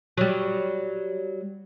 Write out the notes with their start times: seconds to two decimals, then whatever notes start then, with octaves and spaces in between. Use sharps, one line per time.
0.17 F#3 G3